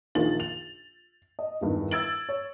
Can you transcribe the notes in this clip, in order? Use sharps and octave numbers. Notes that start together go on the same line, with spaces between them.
A#1 D#3 F4 A6 F#7
F7
D#5
E2 G2 D#3
E6 G#6 A6 D7 F#7
C#5